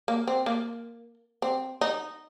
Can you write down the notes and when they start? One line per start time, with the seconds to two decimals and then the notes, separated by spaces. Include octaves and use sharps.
0.08 A#3
0.28 C4
0.46 A#3
1.42 C4
1.81 D#4